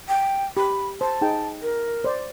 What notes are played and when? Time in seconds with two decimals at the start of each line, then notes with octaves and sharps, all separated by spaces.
0.08 G5
0.57 G4 B5
1.01 C5 A5
1.21 D#4 G#4 G5
1.62 A#4
2.04 C5 D5